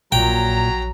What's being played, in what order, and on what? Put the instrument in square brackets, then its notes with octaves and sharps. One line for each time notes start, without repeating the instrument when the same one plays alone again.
[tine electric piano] A#1 [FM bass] A#2 [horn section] F#3 A#5 [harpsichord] G5